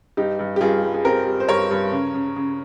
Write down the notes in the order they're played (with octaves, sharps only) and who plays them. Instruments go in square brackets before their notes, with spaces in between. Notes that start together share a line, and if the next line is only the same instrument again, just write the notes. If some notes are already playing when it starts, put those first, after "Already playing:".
[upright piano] G2 D#4 G4
G2
G4
G2 F4 G#4
G3
G#4
C4 G4 A#4
G3
C5
G2 A#4 C#5
G2
C#3
C#3
C#3